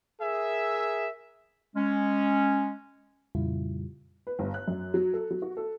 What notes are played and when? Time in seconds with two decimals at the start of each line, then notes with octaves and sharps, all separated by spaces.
0.21 G#4 A#4 E5
1.76 G#3 C#4
3.35 F2 A#2 C#3 G3 E4 F4
4.27 B4
4.39 G1
4.54 F#6
4.68 F#2
4.94 F#3
5.13 A4
5.31 F#3
5.42 F#4
5.57 A4